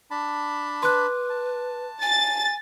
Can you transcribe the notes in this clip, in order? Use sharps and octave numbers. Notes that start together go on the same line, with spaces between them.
D4 A5 B5
B4 C6 D6 F#6
A5
G#5 A6